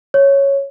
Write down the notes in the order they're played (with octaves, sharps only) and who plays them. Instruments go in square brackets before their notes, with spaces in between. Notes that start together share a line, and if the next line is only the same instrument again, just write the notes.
[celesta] C#5